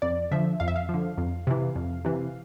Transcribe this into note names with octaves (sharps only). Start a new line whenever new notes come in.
F2 D5
D3 F3 E5
F2 F5
E5
F5
D3 F3
F2
C3 E3
F2
C3 E3